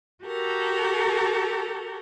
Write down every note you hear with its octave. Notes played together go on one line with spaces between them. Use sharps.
F#4 G4 A4 A#4